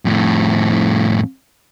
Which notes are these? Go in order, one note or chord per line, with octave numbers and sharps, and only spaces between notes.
F2 A2